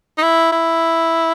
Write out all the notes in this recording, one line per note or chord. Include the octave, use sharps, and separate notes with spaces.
D#4
E4
E4